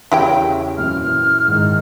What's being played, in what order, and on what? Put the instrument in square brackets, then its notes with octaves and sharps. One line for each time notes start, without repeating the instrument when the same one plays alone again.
[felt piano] E2 C#3 C#4 [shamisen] E4 G4 G5
[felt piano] F#2 A#2 E3 [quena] F6
[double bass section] G#2 D#3